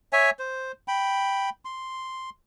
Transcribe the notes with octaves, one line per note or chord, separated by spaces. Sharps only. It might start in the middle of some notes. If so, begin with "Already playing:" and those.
C#5 E5 G#5
C5
G5 B5
C6